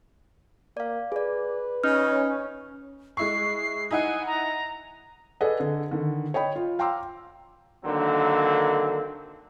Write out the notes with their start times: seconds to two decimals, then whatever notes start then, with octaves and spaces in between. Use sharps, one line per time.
0.77 A#3 D5 F5
1.12 G#4 B4 D5
1.84 C#3 C#4 D#4 F6
3.17 G#3 E4 C#6 C7
3.91 D#4 E4 F#5 G#5
4.27 A#5
5.41 G#4 A4 B4 D5 D#5 F#5
5.60 D3 G#4
5.91 D3 D#3
6.34 C#5 D#5 G5 B5
6.56 F4
6.79 F5 G5 A#5 C6 D6 E6
7.85 D3 D#3 F#3 A#3 C4